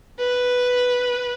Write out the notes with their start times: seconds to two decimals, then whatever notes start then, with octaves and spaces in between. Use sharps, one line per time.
0.19 B4